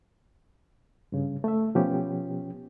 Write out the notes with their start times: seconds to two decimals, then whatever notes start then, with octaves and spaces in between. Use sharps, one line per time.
1.12 G2 C#3
1.44 A3 E5
1.75 B2 F3 B3 C#4 G4